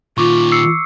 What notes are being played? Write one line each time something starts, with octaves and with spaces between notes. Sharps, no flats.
A#2 D#3 F4 C#6 D6
E6 C7 C#7